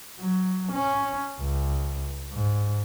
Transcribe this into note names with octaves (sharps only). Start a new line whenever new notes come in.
F#3
C#4
C#2
G#2